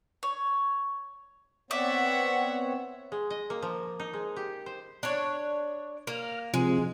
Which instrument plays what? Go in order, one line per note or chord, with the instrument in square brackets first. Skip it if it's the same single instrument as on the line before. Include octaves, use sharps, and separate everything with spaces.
[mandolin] C#5
[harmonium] B3 C4 C#5 [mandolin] D5 [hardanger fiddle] E5 F#5
[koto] G#3
D#5
A#3
F3
D#4
G#3
G4
C5
[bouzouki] D4 C#5
[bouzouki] A#3 [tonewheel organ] F6
[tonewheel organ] C3 F3 [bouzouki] G#3